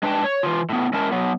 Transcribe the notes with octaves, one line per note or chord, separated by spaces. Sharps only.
G#3 D4 B4 D5 G5 A5
C#5
E3 F4
A2 B3
G#3 C#4 E4 A#4 A5
F#3 B3